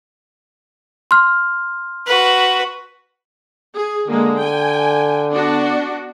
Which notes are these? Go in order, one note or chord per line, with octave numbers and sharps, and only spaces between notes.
C6 F6
F#4 B4
G#4
D3 G#3 A#3
G5 G#5
B3 D4 F#4